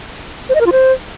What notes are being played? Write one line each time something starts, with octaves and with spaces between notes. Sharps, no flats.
C5
D#5
A#4
F4
C5